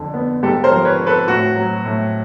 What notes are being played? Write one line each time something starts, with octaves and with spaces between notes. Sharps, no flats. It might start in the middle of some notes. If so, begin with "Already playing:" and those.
Already playing: F2 D3
B3
G#2 G4 A4
A#4 C5
F3
B4 C#5
C4
A4 B4
A2 F#4
F#3
A2